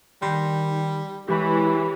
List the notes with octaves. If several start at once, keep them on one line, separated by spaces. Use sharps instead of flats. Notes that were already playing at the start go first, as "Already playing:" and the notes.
D#3 G3 C6 G6 A#6
E3 G#3 G4 C#5 B5